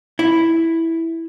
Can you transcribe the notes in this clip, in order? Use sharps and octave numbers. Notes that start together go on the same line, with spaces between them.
E4